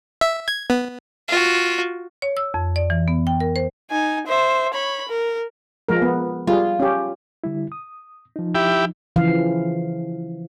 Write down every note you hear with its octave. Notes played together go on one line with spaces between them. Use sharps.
E5
G#6
B3
F4 F#4
C#5
E6
F2
D5
E3
B3
G5
A#4
C5
D#4 G#5
C5 E5
C#5 B5
A#4
F3 G#3 A#4
B3
G3 F4 G#4
C#4 G4
D3 G3 E4
D#6
F3 D#4
E4 G4
C#3 E3 F3 F5